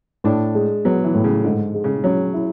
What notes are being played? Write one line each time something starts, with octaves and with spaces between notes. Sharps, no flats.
A2 D4
G#3
F#3 B3
E3
A2
C#3
G#2 D3
G#3
C#3
F#3 C#4
E4